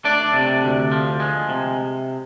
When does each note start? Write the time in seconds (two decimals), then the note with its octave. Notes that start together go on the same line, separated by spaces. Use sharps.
0.05 A3 D4 D5
0.34 C3
0.63 D2
0.92 F3
1.20 G#3
1.49 C3